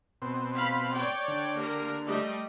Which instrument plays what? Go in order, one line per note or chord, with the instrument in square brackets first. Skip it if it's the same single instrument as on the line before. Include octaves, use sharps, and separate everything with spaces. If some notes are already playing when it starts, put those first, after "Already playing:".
[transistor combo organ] B2 C4
[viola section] F5 B5
C#5 D5 G5
[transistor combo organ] D3
[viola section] A#3 G4 A#4
G3 A3 D#5